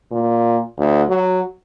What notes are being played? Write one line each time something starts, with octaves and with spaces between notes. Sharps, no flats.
A#2
D2
F#3